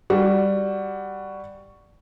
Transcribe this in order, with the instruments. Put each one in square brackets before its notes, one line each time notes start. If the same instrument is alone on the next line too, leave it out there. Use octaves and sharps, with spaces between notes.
[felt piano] G3 F#4